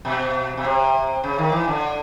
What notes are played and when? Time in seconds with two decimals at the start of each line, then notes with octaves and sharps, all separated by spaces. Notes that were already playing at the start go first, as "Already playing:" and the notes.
0.05 B2
0.57 B2
0.65 C3
1.24 C#3
1.38 D#3
1.52 E3
1.68 D3